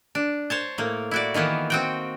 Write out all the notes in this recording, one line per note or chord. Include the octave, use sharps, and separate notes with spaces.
D4
C5 C#5 A5
A2 A#3
E4 F#4 D5
D#3 E3 A#3 B3
C4 F#4 G5